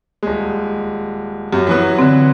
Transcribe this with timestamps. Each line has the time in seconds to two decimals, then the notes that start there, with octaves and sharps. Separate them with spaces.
0.23 D#1 G#3
1.53 F#2 G4
1.67 E3 F#3 B3
1.99 D3 C4